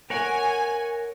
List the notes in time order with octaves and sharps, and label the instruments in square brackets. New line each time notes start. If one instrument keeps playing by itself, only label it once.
[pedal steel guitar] A#4 C#5 F#5 [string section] G#5